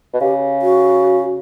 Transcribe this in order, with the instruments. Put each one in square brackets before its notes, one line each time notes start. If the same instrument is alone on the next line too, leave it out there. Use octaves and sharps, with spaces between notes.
[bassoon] B2
[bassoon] C#3 [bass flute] G4
[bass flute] F#4